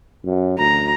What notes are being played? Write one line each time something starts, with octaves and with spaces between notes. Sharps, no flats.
F#2
D2 A#5